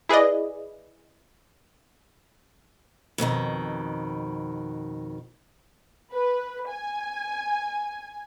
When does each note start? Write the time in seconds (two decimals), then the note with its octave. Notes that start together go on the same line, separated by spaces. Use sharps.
0.09 E4 G#4 B4 D5 D#5
3.18 F2 B2 D3 D#3
6.13 B4
6.69 G#5